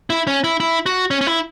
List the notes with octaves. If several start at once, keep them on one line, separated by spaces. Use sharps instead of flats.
E4
C#4
E4
E4
F#4
C#4
C#4
E4